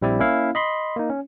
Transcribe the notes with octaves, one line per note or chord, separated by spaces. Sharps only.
A#1 G3 C4 E4 D5
A#3 C#4 E4 F5
D#5 B5 C6
A#3 D#4
C#4